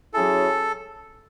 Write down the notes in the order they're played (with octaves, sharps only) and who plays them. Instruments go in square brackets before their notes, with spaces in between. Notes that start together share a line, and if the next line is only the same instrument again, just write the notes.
[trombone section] F#3 C#4 E4 G#4 [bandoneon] A4